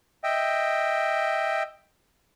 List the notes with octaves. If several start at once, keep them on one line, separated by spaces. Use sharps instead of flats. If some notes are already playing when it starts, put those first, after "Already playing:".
D#5 E5 G5